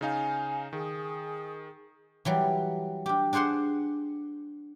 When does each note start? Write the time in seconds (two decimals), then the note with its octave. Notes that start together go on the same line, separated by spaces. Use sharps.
0.01 C#3 D#4 F5 G#5
0.73 D#3 G#4
2.25 E3 F#3 G3
3.06 D4 G4
3.33 D4 G#4 C5 F#5 C6